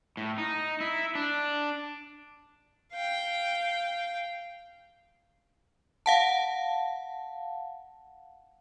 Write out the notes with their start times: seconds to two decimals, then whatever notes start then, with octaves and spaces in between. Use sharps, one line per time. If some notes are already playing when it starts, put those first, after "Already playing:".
0.17 A2
0.38 D#4
0.80 E4
1.15 D4
2.94 F5 G5
6.06 F5 F#5 A5